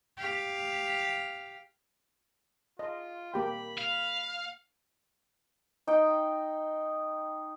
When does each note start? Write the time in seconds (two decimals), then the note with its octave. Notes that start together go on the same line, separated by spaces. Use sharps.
0.17 G4 F5
2.79 F4 D#5
3.34 A#3 G4 G5 B5
3.78 F5
5.87 D#4 D#5 G5